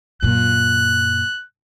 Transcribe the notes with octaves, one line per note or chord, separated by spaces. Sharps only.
F#2 A#2 F#6